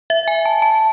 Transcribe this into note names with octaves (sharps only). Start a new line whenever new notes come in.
E5
G#5
A5
A5